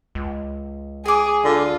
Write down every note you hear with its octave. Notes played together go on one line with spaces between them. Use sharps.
C#2
G#4 G#5 D6
D3 F4